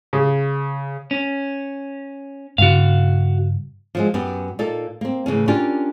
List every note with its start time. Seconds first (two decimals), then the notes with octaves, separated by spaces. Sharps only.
0.13 C#3
1.11 C#4
2.58 G2 C#3 F#4 F5
3.95 F3 F#3 G#3
4.14 F#2 B3 G4
4.59 A#2 A#3 D#4 A4
5.01 A#3 C4
5.26 A2 C#3 E3 C#4
5.48 C#4 D4 F4 G4 A#4